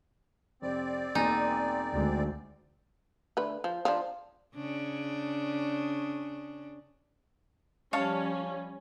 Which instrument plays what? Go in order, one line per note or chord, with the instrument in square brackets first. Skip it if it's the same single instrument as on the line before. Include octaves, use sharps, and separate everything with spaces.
[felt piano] F1 [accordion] C4 D5
[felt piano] E1 A#3 G#5 [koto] D#4
[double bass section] D2 [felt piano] G#3
[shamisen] D3 A3 B4
F3
F3 D4
[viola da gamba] C#3 D4
[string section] F3 G3 C#4 [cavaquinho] C#5 F5 A5